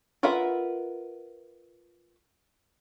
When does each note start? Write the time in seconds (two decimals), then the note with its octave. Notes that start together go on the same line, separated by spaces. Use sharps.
0.23 F4 A#4 B4 E5 F#5